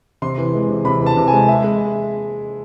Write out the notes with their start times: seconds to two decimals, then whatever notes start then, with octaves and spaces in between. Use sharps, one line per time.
0.22 C3 C6
0.38 E3
0.54 G#3
0.69 C3
0.85 C3 B5
1.00 E3
1.06 A5
1.16 C3
1.28 G#5
1.33 G#3
1.48 G#3 E5
1.64 G#3